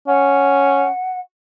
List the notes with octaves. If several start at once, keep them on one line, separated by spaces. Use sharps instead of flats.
C#4 F#5